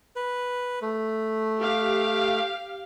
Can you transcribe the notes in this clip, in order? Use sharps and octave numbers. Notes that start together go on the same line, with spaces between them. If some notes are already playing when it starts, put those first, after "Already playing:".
B4
A3
G4 F5